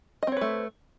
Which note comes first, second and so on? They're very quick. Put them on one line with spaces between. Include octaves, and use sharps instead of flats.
D#5 C4 C#5 B4 A3